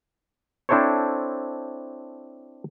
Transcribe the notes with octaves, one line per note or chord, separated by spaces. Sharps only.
C4 D4 E4 A4 C5 C#5